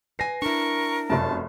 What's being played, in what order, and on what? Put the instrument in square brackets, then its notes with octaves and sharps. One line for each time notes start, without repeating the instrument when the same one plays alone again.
[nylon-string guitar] B4 G#5 [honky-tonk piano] A#6 C7
[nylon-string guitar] D4 E4 [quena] A#4 [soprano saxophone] C#6
[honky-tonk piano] F1 F#2 [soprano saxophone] A5